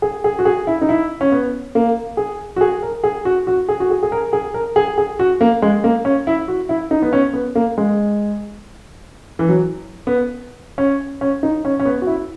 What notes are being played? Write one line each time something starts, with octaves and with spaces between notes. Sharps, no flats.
G#4
G#4
F#4
G#4
E4
D#4
E4
C#4
B3
A#3
G#4
F#4
G#4
A#4
G#4
F#4
F#4
G#4
F#4
G#4
G#4
A#4
G#4
A#4
G#4
G#4
F#4
A#3
G#3
A#3
C#4
E4
F#4
E4
D#4
B3
C#4
B3
A#3
G#3
E3
F#3
B3
C#4
C#4
D#4
C#4
C#4
B3
F#4
E4